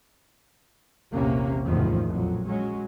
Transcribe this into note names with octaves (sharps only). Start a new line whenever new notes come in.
A#1 E2 C3 A#3 C#4
F#1 E2 A2 D#3 F3
A#1 F2 F#3
F#3 G#3 C#4